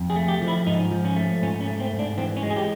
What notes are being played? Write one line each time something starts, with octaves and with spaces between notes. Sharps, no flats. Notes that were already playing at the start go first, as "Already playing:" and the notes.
Already playing: F2
G#4
A3
G4
F3
E4
G#2 D#4
F3
C#4
A3
G#2 C#4
C#4
A3
C4
G#2
D4
E3 C4
C#4
G#3
G#4
G4